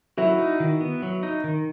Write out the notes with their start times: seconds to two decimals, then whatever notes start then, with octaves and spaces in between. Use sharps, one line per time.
0.17 F#3 E4 F#4
0.38 D#4
0.60 D#3
0.81 B3
1.02 F#3
1.23 D#4
1.44 D#3